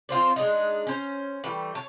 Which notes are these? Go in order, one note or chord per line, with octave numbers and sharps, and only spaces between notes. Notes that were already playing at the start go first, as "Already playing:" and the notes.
C4 F4 C5 D5
G#3 D4 D#4
C#4 C5
E3 G3 A3
C#5 A5